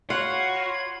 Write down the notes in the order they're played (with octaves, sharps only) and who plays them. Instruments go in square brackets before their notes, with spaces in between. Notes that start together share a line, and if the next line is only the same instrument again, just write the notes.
[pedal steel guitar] F4 [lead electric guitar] F#4 [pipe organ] C#5 B5 G#6 [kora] F#5